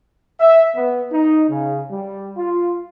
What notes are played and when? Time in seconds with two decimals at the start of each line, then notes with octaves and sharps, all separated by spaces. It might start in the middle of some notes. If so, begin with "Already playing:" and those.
0.40 E5
0.75 B3
1.11 D#4
1.48 C#3
1.91 G3
2.37 F4